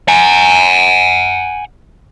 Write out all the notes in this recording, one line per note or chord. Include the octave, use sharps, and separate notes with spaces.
F#5 G#5